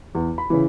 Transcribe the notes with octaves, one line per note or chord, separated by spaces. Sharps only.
E2
B5
C#3 E3